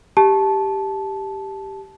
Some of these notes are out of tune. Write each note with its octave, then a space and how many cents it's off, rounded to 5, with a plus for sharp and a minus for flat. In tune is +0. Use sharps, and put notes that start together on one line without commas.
G4 +0 A5 -15